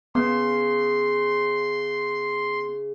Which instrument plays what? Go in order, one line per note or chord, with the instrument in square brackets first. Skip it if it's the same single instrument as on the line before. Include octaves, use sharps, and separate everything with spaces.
[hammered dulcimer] C#3 [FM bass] B3 [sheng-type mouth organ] C6